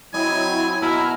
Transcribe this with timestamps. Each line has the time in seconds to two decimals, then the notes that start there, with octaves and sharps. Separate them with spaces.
0.14 F#3 C4 E4 D#5 G#5
0.82 B2 E4 A#5 F6